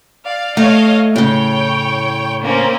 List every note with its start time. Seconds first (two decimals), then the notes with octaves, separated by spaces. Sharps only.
0.25 D5 F5
0.57 A3 C#5 D#5 F5
1.16 A2 C#3 C#5 G5
2.43 A#3 C4 C#4